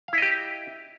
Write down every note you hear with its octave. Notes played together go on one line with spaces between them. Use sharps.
E4 G4 D#5 F5